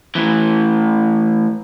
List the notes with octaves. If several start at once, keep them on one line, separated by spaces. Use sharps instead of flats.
A2 E3